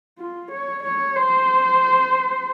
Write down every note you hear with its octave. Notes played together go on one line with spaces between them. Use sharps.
F4
C#5
C#5
C5